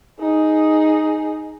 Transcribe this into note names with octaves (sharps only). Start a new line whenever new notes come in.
D#4 G#4